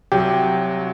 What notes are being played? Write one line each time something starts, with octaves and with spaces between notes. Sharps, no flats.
C2 F#3 G4